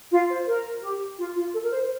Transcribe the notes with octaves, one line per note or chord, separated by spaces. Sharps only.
F4
C5
A#4
G4
F4
F4
A4
A#4
C5